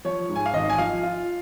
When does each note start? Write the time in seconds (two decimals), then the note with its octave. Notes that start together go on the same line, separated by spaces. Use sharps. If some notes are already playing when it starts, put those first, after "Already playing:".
0.05 F3 C#5
0.29 G#2
0.36 G#5
0.46 F5
0.54 G#1 D#5
0.70 G#5
0.78 F3 F5
1.03 F4